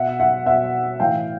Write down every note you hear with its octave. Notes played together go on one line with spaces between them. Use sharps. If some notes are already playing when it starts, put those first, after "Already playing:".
Already playing: B2 E5 F#5
E5 F#5
B2 E5 F#5
A2 E3 F5 G5